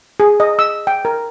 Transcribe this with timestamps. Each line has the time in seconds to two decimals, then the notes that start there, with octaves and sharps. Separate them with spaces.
0.20 G#4
0.40 D#5
0.59 E6
0.87 G5
1.05 A#4